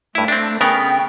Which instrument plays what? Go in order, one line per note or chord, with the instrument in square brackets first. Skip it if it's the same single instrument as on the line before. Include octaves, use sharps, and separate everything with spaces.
[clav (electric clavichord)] G2 E4 [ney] A3
[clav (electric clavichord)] C4 D4
[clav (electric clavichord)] C#3 B3 A#4 [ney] G5